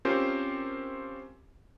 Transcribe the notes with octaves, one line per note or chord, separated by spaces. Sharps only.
C4 C#4 F4 G4 A#4 C5